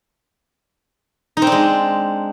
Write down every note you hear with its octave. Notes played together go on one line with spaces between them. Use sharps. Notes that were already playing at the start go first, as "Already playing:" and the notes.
D#4
C4
D4
G#3